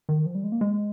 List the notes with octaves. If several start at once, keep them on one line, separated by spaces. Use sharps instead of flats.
D#3
F3
G3
G#3
A#3
G#3